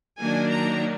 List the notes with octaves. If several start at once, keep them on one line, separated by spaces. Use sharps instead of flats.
D#3 F#3 A#3 D4 G#5
A#5